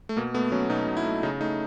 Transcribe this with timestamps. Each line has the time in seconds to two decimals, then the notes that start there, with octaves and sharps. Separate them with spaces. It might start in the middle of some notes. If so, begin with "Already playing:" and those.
0.09 A3
0.17 B2 A#3
0.34 A3 B3
0.52 F#3 C#4
0.70 B2 D#4
0.88 B2
0.97 E4
1.05 A3
1.23 C#3 D#4
1.41 A3 D#4